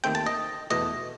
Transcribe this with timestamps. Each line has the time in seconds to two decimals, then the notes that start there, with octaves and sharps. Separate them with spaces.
0.04 D#2 D#3 A3 C4 G5
0.15 A5
0.26 D#5
0.70 E2 B2 A3 D#5